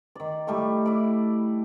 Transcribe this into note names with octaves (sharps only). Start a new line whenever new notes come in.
D#3 D5
A2 G3 A3 C#6
E4 D5